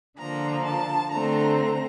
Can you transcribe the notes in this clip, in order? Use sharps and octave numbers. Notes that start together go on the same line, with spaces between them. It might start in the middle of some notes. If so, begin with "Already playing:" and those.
D3 F3 A#3 A#5
A5
D3 A3 C4 A#5